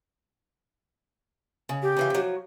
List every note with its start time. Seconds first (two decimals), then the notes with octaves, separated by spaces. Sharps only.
1.69 C#3
1.82 G4
1.97 C#3 E3 F4
2.10 F3 F#3